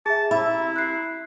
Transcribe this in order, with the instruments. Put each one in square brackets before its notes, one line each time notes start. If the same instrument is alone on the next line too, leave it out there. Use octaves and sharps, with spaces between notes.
[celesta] G#4 E5 [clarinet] A5
[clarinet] E4 [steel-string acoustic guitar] E5 [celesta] B5
[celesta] F#6 C7